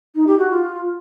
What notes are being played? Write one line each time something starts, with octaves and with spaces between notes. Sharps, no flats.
D#4
G4
F#4
F4